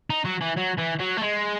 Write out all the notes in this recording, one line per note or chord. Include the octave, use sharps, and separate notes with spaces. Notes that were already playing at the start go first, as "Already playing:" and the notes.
D#4
F#3
E3
F#3
E3
F#3
A3
G#3